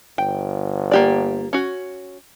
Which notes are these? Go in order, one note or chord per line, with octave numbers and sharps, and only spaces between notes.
G1 G5
A#3 G4 D5
C#4 F#4